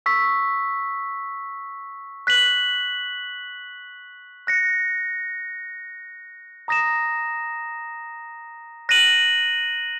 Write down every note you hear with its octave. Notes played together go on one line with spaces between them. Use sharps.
C#6 E6 B6
F#6 B6 F#7
F#6 A#6 C#7
A#5 D#6 A#6 E7
F#6 A#6 D#7 F#7